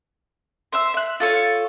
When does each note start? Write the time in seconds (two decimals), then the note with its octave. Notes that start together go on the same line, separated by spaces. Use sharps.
0.72 C5 E5 E6
0.94 E5 F#6
1.20 F4 A4 C#5